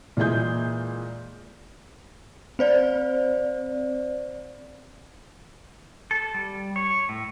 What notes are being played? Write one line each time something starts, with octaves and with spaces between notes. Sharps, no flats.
A#2 E3 G#3 G#4 G6
C4 C5 D5
A4
G3
C#5
A2